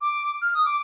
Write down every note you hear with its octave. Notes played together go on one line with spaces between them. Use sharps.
D6
F6
D#6
D6